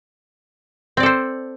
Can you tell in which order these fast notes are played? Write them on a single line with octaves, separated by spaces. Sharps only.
C4 D5 A4 C5